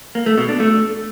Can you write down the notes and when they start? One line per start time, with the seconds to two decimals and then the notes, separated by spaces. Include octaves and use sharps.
0.15 A#3
0.26 A3
0.38 B2
0.49 D4
0.60 A3